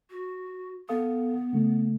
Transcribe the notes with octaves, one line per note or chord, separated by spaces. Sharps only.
F#4
B3 A4 F5 D#6
C#3 A3